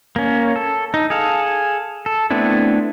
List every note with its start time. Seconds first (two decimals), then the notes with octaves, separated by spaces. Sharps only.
0.16 A#3 C#4
0.56 A4
0.94 D#4
1.10 G#4 A4 F5
2.06 A4
2.31 A3 B3 C4 D4 E4